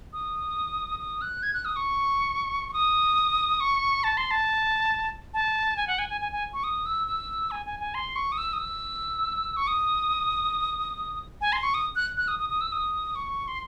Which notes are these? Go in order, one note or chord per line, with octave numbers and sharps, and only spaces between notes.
D#6
D#6
F#6
G#6
F#6
D#6
C#6
C#6
D#6
C#6
A5
C6
A5
A5
G#5
F#5
G#5
G#5
G#5
G#5
C#6
D#6
E6
E6
G#5
G#5
G#5
C6
C#6
D#6
E6
D#6
E6
C#6
D#6
G#5
C6
C#6
D#6
F#6
F#6
D#6
D#6
D#6
E6
D#6
C#6
C6